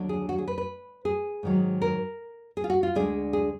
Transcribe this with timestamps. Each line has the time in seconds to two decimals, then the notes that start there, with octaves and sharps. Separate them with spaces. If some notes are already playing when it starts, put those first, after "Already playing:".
Already playing: D#2 D3 F#3 D4
0.09 G#4
0.29 F#4
0.38 G#4
0.48 B4
0.58 B4
1.05 G#4
1.43 G#2 D#3 F#3
1.82 A#4
2.57 G#4
2.64 F4
2.70 F#4
2.83 F4
2.95 D2 D3 G#3 D4 G#4
3.33 G#4